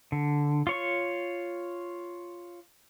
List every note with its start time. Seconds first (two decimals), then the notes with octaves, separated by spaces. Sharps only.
0.12 D3
0.67 F4 C#5 C#6